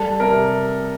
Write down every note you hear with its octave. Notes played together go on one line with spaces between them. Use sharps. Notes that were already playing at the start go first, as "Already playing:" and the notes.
Already playing: G3 A4
C3 A#4